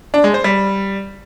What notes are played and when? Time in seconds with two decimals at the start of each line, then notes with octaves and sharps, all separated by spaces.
0.14 D4
0.24 G#3
0.34 C5
0.44 G3